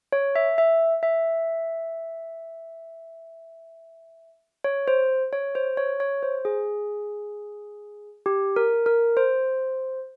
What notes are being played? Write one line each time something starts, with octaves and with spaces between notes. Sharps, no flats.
C#5
E5
E5
E5
C#5
C5
C#5
C5
C#5
C#5
C5
G#4
G4
A#4
A#4
C5